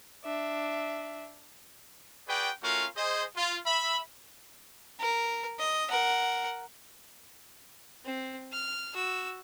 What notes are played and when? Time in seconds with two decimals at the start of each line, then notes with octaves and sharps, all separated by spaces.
0.25 D4 E5
2.29 F#4 G#4 B4 D5 G5
2.62 A3 C#4 F4 F#4 A#4 F5
2.97 G#4 C5 D#5
3.36 F4
3.67 E5 B5
5.00 A#4
5.59 D#5
5.90 A#4 F#5
8.05 C4
8.52 F6
8.94 F#4 E6